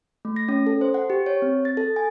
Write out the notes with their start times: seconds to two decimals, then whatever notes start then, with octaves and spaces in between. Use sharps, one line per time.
0.25 A3
0.36 A#6
0.49 C#4
0.67 A4
0.81 C5
0.94 F#5
1.10 G4
1.26 C#5
1.42 C4
1.65 A6
1.77 A4
1.96 G#5